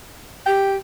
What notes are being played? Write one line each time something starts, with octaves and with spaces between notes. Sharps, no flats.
G4 G5